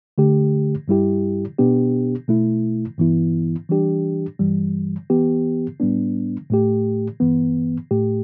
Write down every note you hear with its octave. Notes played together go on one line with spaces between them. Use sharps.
D3 A3 G4
G2 G3 E4 G4
B2 B3 D4 G4
B2 A3 E4
G2 E3 B3 E4
E3 G3 D4 G4
G2 E3 G3
E3 B3 G4
A2 G3 B3 D4
A2 A3 G4
G2 E3 B3
A2 A3 G4